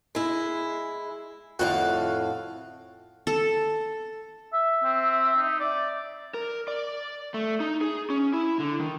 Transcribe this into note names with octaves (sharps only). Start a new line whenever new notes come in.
G#3 E4
F2 A2 F#4 F5
A4
E5
C4
D#4
D5
A#4
D5
A3
D#4
G#4
C#4
E4
D3
D#3